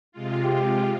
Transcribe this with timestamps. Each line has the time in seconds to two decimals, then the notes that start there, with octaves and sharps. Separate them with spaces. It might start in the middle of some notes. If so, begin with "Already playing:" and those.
0.12 C3 G#3 F4
0.44 G4